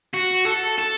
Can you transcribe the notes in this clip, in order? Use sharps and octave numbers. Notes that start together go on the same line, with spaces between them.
F#4
A4
A4